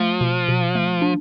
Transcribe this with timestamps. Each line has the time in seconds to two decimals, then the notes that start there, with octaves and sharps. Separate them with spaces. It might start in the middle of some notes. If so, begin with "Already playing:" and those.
Already playing: F3 A3
0.21 B2
0.48 B2
0.75 A3
1.02 D4